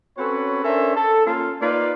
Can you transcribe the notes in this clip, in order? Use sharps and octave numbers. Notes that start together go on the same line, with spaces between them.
C4 C#4 F#4 A4 B4 C#5
C#4 D4 A4 A#4 C5 E5
A4
A#3 C#4 F4 A4
A#3 D#4 F4 B4 D5